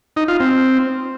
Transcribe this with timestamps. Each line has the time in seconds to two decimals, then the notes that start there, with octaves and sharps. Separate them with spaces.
0.16 D#4
0.28 F4
0.40 C4